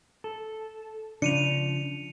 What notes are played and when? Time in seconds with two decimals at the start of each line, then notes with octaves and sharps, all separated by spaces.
0.24 A4
1.22 C#3 F3 D4 C#7 D#7 F7